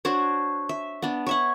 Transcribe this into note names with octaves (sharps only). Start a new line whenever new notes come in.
D4 F#4 C5 C#5
E5
B3 D4
C#5 E5 F#5